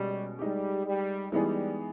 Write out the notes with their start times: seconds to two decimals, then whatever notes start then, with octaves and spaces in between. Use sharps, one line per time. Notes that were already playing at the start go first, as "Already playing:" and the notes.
Already playing: B2 G3 G#3 C#4
0.39 G3 G#3 D#4 G4
0.86 G3
1.32 E3 G3 G#3 B3 D#4 G#4